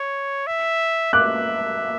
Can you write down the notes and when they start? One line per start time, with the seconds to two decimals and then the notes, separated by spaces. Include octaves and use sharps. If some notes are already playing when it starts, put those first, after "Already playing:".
Already playing: C#5
0.47 E5
1.13 E5 D6 F#6